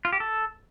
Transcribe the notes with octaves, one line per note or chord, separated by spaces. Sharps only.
F4
G4
A4